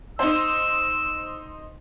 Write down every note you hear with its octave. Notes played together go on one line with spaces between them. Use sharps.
D#4 C5 E6